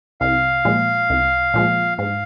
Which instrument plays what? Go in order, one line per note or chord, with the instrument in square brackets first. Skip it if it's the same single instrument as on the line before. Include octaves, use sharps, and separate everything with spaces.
[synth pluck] C2 [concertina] F5
[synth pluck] A#2 F3 G#3
C2
A#2 F3 G#3
[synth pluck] G#2 [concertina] F5